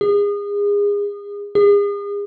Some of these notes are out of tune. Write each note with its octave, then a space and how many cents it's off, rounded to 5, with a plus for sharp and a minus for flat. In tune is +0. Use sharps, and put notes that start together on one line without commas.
G#4 -30
G#4 -40